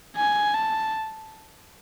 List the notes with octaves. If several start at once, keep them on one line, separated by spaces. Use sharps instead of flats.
G#5
A5